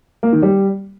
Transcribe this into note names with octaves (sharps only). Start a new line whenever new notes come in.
A#3
D#3
G3